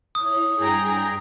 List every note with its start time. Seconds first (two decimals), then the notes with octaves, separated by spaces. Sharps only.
0.15 E4 C#5 D#6
0.58 G2 G#4 G5 A#5